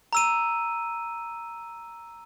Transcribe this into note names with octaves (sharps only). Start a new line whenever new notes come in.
A#5 E6 D#7